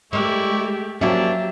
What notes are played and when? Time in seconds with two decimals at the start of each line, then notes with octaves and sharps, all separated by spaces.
0.13 G#3 A3 E4 G4 A#4 D5 C#6
1.01 F#3 A#3 C#4 D4 G4 E5 A5